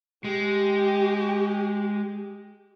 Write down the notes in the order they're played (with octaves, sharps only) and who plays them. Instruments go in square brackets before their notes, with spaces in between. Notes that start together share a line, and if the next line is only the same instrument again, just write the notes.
[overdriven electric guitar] G#3 [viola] G4